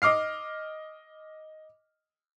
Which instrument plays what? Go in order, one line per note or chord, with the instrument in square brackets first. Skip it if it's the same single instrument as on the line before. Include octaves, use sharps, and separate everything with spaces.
[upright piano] D#5 D6 F6 C7